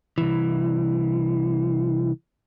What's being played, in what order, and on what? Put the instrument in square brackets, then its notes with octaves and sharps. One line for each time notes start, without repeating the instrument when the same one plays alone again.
[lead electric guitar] C2 E3